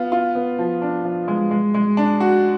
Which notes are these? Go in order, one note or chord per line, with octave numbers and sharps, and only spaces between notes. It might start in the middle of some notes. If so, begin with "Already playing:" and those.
Already playing: B3 F4
F4
B3
F3
D4
F3
G#3
G#3
G#3
D4
F#4